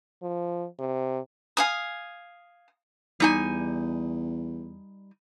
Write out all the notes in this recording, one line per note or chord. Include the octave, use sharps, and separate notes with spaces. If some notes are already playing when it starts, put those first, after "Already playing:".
F3
C3
F5 G#5 D#6
E2 G3 D#4 G#5